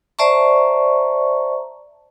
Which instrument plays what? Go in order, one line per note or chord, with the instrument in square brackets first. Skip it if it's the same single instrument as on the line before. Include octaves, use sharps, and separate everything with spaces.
[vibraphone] C5 D5 E5 A5 A#5 C#6